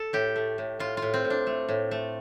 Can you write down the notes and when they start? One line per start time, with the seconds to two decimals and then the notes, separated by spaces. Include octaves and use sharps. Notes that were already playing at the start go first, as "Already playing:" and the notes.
Already playing: A4
0.13 A2 G4
0.36 A3
0.58 A2
0.79 A2 F4
0.97 F4
1.02 A2
1.14 C4
1.25 A2
1.30 D4
1.47 A3
1.69 A2
1.91 A3